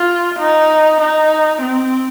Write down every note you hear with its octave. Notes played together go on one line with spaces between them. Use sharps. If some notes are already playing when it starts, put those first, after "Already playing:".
Already playing: F4
D#4
D#4
C4